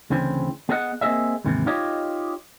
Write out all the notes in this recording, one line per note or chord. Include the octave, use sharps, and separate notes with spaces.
D2 C#3 E3 C4
B3 G#4 B4 D#5 E5 F#5
A#3 C4 D4 G#4 D#5 E5
D#2 G#2 C3 E3
D#4 F4 G4 C#5 D#5